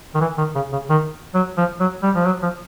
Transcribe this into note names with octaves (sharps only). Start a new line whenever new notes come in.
D#3
E3
D#3
C#3
C#3
D#3
F#3
F3
F#3
G3
F3
F#3
F3